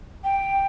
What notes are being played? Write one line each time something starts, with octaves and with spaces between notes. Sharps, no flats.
G5